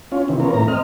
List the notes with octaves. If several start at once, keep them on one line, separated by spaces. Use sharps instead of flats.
C#4 F4
C3 D#3 E3
B3 C#4 F4 A#4
A2 E3 A#3 A#5
C4 D#5 F6